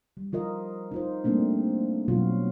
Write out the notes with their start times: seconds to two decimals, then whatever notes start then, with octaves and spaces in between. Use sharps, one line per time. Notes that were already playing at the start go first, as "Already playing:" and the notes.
0.17 G3
0.33 F3 F4 A#4 D#5
0.91 D#4 F4 C5
1.24 G3 A3 A#3 C4 D4
2.08 B2 F#3 F4 F#4